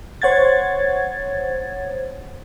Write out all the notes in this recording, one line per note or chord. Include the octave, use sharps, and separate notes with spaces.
C5 C#5 F#5 G#6 A6